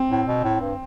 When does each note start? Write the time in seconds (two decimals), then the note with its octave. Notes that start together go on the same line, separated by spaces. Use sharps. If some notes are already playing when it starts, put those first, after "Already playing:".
Already playing: C4
0.11 A2
0.27 B2
0.44 A2
0.61 G2